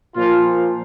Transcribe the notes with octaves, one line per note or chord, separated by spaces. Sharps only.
A#2 F3 F4